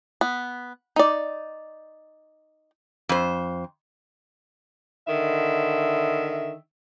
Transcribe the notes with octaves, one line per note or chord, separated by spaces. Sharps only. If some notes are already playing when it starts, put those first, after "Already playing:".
B3
D#4 D5
F2 C5
D3 D#3 E5